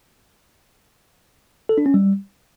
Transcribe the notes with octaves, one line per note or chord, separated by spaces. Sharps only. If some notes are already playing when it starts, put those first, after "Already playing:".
A4
D4
C#4
G3